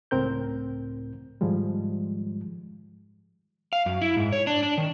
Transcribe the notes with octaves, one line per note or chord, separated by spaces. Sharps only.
C#2 A2 C4 A#4 G6
G#2 D#3 F3 G3 G#3
F5
F#2
E4
G#2
C#5
D4
D4
D#3